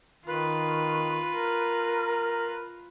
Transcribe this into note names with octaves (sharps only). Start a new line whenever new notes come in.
D#3 F4 B4
A#4